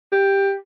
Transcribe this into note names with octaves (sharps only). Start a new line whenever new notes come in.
G4